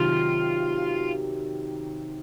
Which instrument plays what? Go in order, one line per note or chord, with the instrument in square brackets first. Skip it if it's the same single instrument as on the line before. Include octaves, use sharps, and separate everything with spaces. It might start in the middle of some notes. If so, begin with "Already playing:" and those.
Already playing: [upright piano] C3 D#3 F#3 [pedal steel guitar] F4